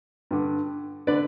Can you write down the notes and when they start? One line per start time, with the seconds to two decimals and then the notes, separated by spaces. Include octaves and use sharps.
0.31 G2 D3
1.07 D3 B4 D5